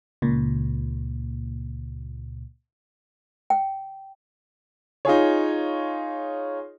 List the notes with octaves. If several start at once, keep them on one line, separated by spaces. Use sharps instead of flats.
C#2 A#2
G5
D#4 F4 G#4 C#5